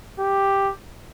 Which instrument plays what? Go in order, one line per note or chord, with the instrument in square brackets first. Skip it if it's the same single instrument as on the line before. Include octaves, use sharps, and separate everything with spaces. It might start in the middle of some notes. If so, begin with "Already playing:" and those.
[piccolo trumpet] G4